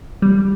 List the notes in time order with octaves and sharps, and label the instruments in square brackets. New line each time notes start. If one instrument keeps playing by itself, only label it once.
[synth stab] G3